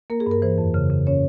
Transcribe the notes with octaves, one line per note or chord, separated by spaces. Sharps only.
A#3 A#4
G#4
G2 A#4
E3 C5
F2
C#3
C#3
C#4 C#5